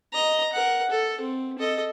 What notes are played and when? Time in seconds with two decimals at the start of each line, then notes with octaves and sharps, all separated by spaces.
0.13 D#5 A#5
0.52 A#4 F#5
0.90 A4
1.21 C4
1.58 A4 D#5